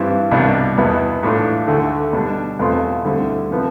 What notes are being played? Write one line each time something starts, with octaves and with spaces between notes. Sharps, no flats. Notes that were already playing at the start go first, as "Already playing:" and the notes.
Already playing: G2 E3 G3 C4 E4
C2 B2 G3 D4
E2 B2 B3 E4
A2 E3 A3 D4 F4
D2 D3 A3
B2 G3 D4
E2 B2 A3 C4 F4
D2 D3 G3 C4 E4
C3 F3 B3